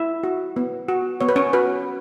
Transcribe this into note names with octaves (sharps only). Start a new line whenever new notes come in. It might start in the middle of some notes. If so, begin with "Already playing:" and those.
Already playing: E4 E5
F#4
B3
F#4
B3 C#5
B4
C#4 C#5
F#4 B4